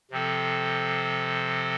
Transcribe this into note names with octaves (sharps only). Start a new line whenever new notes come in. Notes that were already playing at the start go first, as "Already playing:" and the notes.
C3 F3 C4 A4